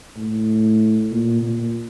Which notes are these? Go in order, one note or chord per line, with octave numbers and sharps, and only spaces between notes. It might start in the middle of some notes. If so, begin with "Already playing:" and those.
A2
A#2
A#2